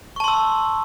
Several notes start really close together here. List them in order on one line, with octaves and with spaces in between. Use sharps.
C#6 A5 C6 E6